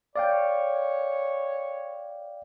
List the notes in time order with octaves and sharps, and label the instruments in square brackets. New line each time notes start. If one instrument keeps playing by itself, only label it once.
[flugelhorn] C#5 [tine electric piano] D5 F5 G5